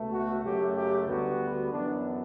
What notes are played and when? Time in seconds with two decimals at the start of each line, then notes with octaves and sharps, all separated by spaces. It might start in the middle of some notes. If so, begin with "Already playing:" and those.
Already playing: C#2 B2 A3
0.10 F#4
0.42 F#2 C#3 F#3 A3 G4
0.75 G4
1.07 D2 D3 G3 B3 F#4
1.71 F#2 E3 B3 D4